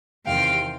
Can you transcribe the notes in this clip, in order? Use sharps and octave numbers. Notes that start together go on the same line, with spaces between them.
E2 C3 D#3 F5 G5